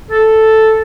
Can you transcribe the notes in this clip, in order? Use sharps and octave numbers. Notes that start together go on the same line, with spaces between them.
A4